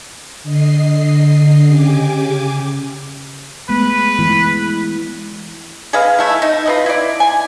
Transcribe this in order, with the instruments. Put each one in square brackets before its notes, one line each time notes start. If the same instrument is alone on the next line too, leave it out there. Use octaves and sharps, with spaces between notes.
[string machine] D3 D#5 C7
C#3 G4 G#5 D6
[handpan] G#3 A3 B3 [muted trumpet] B4
[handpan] E3 G#3 E4
[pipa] G#4 B4 D#5 F5
A3 E4
D#4
F4 B4 D#5
E4 D5
G#5